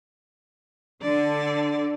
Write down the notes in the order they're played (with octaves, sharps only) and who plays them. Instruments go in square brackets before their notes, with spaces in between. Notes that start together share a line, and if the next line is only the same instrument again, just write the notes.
[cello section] D3 [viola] D5